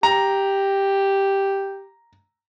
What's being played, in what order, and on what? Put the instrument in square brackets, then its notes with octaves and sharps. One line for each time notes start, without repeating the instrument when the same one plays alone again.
[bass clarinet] G4 [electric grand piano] A#5